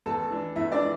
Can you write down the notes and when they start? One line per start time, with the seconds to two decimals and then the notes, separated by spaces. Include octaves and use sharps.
0.06 E2 A4 A5
0.31 E3 D4
0.56 E2 E4 E5
0.72 D4 D5
0.80 E3